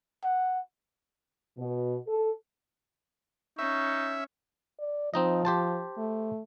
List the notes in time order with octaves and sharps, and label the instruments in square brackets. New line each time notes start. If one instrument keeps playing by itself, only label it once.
[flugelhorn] F#5
[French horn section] B2
A4
[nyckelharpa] C#4 [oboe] D#4 [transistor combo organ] E5 [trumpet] C#6
[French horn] D5
[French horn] F3 [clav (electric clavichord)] C4 D#4 D#5
[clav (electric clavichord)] G4 C5 A5
[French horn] A3